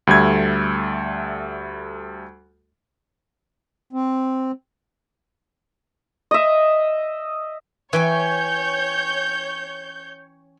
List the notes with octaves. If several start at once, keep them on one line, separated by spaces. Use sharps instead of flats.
D2 G3 A3 G#6
C4
D#5 E5
E3 C#4 C#5 G5 G#5 G6